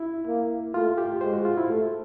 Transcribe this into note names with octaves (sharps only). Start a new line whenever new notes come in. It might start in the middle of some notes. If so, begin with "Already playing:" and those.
Already playing: E4
A#3
A3 F4
G4
G#3 C5
F#4
F4
E4
A3